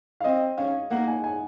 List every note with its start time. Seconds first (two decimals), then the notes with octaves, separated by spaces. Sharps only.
0.20 F5
0.24 C4 D#5
0.58 C#4 F5
0.91 A#3 F#5
1.08 G#5
1.24 G#5